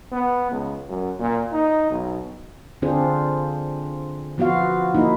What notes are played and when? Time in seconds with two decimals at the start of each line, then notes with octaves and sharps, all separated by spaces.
0.12 B3
0.52 C#2
0.89 F#2
1.19 A#2
1.53 D#4
1.90 B1
2.82 D3 C4 D4 F4 G#4 C5
4.38 F3 B3 F4 F#4 F5
4.95 A#3 D#4 E4